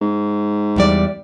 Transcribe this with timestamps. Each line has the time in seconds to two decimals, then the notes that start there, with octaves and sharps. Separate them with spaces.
0.01 G#2
0.76 E2 G3 D5